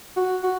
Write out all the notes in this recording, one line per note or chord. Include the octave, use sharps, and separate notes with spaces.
F#4
F#4